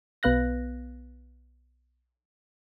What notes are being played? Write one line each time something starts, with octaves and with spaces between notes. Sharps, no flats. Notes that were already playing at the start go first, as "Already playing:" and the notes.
B1 B3 B4 F5 F#6 A#6